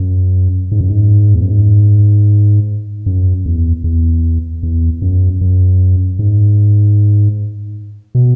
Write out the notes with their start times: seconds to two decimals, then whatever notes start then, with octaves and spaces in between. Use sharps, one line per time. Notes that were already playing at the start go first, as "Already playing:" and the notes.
Already playing: F#2
0.72 G#2
0.81 F#2
0.90 G#2
1.35 E2
1.42 F#2
1.50 G#2
3.06 F#2
3.46 E2
3.84 E2
4.63 E2
5.02 F#2
5.41 F#2
6.19 G#2
8.15 B2